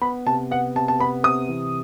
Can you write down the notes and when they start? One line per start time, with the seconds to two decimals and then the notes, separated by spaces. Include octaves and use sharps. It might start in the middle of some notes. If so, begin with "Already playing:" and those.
0.02 B3 B5
0.27 C3 A5
0.51 B3 F#5
0.76 C3 A5
0.88 A5
0.99 B3 B5
1.24 C3 D#6
1.49 E3